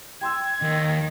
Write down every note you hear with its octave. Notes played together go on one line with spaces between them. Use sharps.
G5 C6 E6 G#6
D#2 D#3